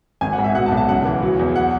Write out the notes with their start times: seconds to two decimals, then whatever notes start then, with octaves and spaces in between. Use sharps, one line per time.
0.21 G#1 G#5
0.33 F#5
0.38 G#2
0.44 E5
0.55 B2 F#5
0.66 A5
0.72 B1
0.77 A5
0.89 C#2 F#5
1.05 E3
1.22 F#3
1.39 E2
1.56 F#5